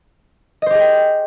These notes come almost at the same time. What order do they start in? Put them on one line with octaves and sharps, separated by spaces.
D#5 C5 G4 G#4 G5